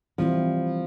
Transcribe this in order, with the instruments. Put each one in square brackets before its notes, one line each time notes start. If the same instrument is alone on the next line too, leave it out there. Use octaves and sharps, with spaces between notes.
[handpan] E3 G3 C4 E4 [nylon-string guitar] F3